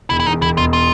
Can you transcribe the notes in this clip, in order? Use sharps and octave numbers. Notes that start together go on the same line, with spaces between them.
E1 E4
E4
E2 D#4
E1 E4
E1 F4
F4